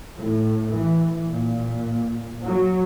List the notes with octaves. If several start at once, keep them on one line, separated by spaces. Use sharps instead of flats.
A2
E3
A#2
F#3